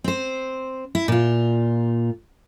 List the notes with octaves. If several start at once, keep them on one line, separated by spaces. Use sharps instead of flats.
C4 C5
E4
A#2 F4